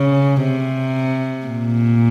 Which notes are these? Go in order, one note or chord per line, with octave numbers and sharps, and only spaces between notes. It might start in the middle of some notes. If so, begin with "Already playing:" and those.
Already playing: C#3
C3
A#2